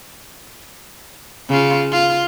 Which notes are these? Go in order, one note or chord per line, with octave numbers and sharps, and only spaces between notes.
C#3 F4
F4